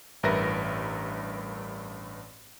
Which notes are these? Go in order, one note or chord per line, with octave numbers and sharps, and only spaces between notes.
A1 G2 A#4 B4 E5 A#6